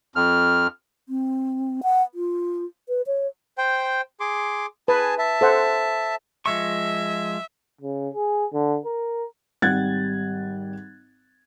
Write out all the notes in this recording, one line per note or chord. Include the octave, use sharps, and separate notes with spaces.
F2 F6
C4
F#5
F4
B4
C#5
C5 G5
G#4 C6 D6
G#4 B4 G#5 A5
E5 A5
A4 C5 F#5
F3 G#3 E5 C#6
C#3
G#4
D3
A#4
G#1 G3 F#5 F#6 G#6 A6